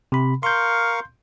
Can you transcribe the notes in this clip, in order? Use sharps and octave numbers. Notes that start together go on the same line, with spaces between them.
C3 B5
A#4 F5 C6 C#6 G6